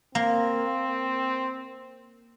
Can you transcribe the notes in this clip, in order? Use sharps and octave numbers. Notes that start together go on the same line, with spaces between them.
A#3 C4